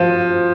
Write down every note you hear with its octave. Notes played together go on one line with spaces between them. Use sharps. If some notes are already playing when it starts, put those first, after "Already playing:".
Already playing: F3